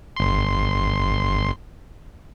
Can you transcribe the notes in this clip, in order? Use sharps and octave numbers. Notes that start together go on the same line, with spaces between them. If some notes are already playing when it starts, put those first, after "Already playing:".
G1 C6